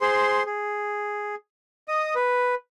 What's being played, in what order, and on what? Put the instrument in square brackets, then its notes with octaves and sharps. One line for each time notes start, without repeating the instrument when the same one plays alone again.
[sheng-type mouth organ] G#4 C5 C6
G#4
D#5 D#6
B4